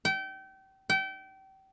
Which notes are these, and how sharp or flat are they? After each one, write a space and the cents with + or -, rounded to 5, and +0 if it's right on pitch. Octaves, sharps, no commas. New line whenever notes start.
G5 -30
G5 -30